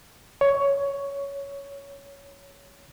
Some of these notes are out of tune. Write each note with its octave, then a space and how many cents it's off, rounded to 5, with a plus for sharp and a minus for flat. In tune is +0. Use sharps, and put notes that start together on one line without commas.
C#5 +10